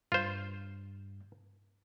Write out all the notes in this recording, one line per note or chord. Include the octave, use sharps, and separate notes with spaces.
G2 F4 C5